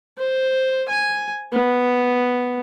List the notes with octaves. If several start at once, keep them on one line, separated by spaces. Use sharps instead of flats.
C5
G#5
B3